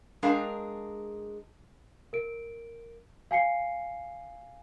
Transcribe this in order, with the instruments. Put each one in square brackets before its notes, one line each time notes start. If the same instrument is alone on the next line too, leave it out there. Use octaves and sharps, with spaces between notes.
[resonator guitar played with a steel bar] G#3 D4 G#4 A#4 F5 G5
[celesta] A#4 D7
F5 G#5 C7 C#7